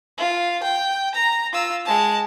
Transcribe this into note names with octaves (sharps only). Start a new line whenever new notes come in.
F4
G5
A#5
F4 E6
G#3 A5